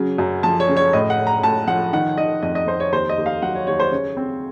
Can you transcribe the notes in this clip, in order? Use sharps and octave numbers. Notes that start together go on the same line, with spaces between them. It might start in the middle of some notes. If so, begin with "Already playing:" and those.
Already playing: C#3 F#3
F#2
F3 A5
C#5
C#3
C#5
A2 D#5
F#5
A2
A#5
A2 A5
F3 F#5
D#3 F#5
D#3 D#5
F2 D#5
D#5
F2 C5
C#5
D#2 C5
D#5
D#2
F5
F#3 F#5
C#5
D#2 C#5
C5
C#3 C#5
C4